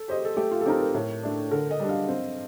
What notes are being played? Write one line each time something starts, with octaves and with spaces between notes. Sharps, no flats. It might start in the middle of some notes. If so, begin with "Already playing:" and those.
Already playing: A4
G4 C5 D#5
A4
A3 G4
F4
A4
C4 D#4 G4 A#4
A#4
A2 A#4
A3 D4
D3 A#4
D#5
G3 D4
F5
C4